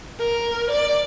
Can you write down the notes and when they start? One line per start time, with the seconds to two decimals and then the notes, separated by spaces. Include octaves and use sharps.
0.19 A#4
0.71 D5